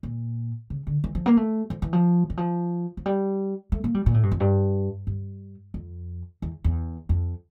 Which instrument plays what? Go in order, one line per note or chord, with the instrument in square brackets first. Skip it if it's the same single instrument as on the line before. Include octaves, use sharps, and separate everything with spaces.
[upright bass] A#2
C#3
D3
E3
F3
A#3
A3
F3
E3
F3
E3
F3
F3
G3
A3
A#3
G3
A#2
A2
G2
F2
G2
G2
F2
E2
E2
F2